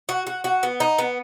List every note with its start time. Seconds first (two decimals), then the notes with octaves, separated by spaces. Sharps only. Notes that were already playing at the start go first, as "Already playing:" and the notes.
0.09 F#4
0.27 F#4
0.44 F#4
0.63 B3
0.80 D#4
0.98 B3